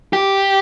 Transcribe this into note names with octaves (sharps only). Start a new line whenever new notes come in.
G4